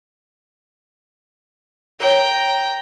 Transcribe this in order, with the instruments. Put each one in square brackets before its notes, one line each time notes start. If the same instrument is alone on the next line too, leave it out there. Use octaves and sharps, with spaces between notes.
[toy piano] A#4 C#5 [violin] G5 A#5